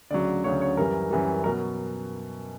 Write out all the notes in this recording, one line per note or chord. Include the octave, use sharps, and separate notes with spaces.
D2 C#3 F#3 D5
D2 C#3 F#3 C#5
C#5
F#2 E3 G3 A#4
F#2 E3 G3
B2 F#3 A#4